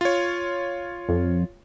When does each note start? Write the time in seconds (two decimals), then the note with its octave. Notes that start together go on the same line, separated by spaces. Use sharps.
0.01 F4 C#5
1.09 F2